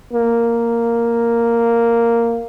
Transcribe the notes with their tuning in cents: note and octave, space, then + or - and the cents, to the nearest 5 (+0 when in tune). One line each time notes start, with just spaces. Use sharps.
A#3 -5